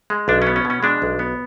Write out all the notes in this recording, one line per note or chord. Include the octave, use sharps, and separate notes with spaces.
G#3
B1 D4
C#4
B3
C#4
B2
C#4
G#3 D4
B1
B3